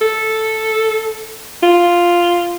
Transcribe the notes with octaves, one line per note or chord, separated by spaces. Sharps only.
A4
F4